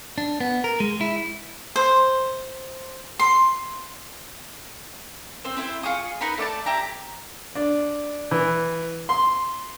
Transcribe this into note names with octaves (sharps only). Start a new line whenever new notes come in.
D4
B3
A#4
G#3
E4
C5
C6
C4 C5
C4 E4 A#4 C5
F4 G#4 C#6 D#6
D#4 A#4 B4 B5
A3 D5 F5 A5
E4 G4 A#5
D4
E3
C6